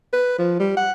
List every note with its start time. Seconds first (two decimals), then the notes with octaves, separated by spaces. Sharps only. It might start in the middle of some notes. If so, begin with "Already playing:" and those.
0.13 B4
0.39 F3
0.60 G3
0.77 F#5